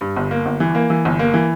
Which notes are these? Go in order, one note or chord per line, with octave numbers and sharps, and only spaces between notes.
G2
G1
A#3
G1
E3
A#3
E3
G1
A#3
E3